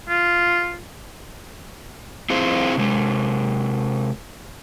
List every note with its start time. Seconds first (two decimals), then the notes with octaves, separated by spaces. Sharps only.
0.08 F4
2.30 C4 E4 F4 G#4 C5
2.77 C3 G#3